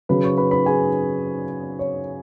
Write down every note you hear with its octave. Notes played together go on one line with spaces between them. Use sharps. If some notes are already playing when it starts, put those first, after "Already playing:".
C#3 F#3 B4 B5
C#5 C#6
B4 B5
B4 B5
G#4 G#5
C#5